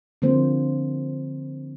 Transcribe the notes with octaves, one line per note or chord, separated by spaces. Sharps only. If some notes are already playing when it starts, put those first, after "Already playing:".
D3 F3 A#3 C4 C5